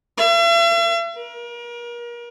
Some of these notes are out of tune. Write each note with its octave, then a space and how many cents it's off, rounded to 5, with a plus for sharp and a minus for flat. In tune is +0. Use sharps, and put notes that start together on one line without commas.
E5 +45
A#4 +35